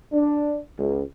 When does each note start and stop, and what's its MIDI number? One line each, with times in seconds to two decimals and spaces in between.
0.13 0.59 62
0.78 1.03 37